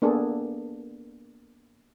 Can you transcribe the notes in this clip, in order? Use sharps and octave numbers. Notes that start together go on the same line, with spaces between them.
A#3 B3 D4 G#4 A4